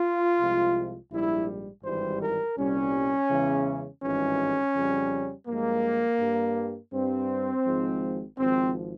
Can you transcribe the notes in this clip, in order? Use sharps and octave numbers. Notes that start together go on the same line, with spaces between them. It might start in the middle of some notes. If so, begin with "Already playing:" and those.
Already playing: F4
C2 C3 F3 G#3
A#1 G#2 G3 E4
G#1 G2 E3 G3 C5
A#4
C2 A#2 G3 C#4
E2 C#3 E3 G#3
G#1 G2 E3 G#3 C#4
F2 C#3 G3
G2 F3 G#3 A#3
G2 G3
G2 G3 C4
G#1 G#2 F3 G#3
G#1 G#2 F3 C4